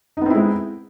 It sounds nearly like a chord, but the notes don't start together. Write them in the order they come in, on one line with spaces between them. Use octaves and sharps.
D#4 B3 C4 E4 G#3